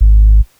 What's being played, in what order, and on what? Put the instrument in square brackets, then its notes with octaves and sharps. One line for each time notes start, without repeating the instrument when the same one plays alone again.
[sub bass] G#1